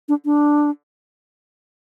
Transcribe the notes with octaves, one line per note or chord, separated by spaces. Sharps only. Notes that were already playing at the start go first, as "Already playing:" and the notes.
D4
D4